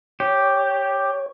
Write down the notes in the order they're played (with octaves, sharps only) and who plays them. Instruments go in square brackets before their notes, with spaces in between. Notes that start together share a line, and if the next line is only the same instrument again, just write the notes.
[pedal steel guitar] G4 [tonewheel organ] C#5